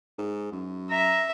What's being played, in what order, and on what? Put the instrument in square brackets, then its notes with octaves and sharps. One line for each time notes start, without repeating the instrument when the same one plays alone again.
[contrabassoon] G#2
F#2
[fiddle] E5 [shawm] A#5